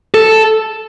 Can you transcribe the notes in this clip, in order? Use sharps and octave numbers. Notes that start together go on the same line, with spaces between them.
A4